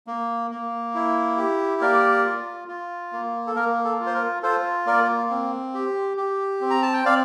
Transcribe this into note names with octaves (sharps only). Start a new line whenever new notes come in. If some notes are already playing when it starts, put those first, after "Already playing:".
A#3
A#3
E4
G4
A#3 A#4 D5
F4
F4
A#3
A4
A#3 A#4
A4
F4
C5
A#4
F4 A4 C5
A#3 A#4 D5
C4
G4
G4
C4
A#5
A5
G5
C4 D5 F5